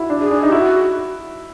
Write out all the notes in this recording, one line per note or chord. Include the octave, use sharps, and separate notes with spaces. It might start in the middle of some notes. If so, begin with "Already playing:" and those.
Already playing: E4 F#4
D4
G#4
D4
D#4
G4
E4 F#4